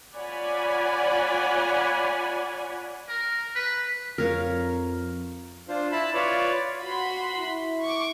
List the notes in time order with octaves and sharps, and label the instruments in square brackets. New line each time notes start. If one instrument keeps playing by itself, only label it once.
[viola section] F4 C#5 D5 F#5 G#5 B5
[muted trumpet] A#4
B4
[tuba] F2 [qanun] A#4 C#5 F5
[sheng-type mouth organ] D4 F4 C5
E4 A5 B5
F4 B4 C#5 D5
[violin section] F#4 B5 C6
[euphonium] E4
[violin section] C#6 D6